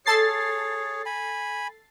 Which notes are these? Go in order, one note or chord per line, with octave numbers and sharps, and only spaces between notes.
G#4 A4 C#5 A6 C7
G#5 B5